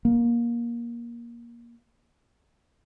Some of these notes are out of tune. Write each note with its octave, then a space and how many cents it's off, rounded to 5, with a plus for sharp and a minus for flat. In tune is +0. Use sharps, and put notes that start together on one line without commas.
A#3 +20